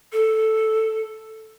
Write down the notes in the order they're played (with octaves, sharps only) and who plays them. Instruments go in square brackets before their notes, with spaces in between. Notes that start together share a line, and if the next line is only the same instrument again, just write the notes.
[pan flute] A4